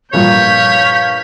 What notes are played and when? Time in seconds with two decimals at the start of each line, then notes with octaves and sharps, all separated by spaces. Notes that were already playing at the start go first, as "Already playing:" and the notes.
0.13 A#1 G2 A#2 C#5 F5 G6 B6